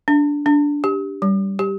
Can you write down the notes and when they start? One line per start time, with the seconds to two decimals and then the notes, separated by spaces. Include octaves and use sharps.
0.08 D4
0.46 D4
0.84 G4
1.22 G3
1.59 G4